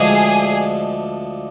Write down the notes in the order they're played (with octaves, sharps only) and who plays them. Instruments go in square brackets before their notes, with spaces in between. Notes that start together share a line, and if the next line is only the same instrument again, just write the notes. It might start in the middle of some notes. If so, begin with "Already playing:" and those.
Already playing: [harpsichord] D2 D3 F3 G#3 D4 [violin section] G#4